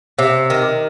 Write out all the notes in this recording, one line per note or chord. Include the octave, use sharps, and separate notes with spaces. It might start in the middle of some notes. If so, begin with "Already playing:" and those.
C3
D#3